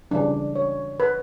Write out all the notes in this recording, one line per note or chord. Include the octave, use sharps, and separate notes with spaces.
C#3 E3 G3 D4
C#5
B4